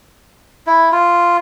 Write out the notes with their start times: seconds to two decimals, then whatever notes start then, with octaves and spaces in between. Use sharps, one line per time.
0.67 E4
0.92 F4